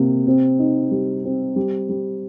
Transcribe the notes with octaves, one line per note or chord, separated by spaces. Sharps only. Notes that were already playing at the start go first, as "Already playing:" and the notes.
Already playing: C3 A#3
C4
D#4
G3
C4
G3
G3